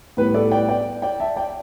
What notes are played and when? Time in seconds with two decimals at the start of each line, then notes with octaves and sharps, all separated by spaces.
0.17 A2 G3 B3 B4
0.34 A4 D5
0.51 D5 G5
0.68 D5 G5
1.02 D5 G5
1.20 E5 A5
1.36 D5 G5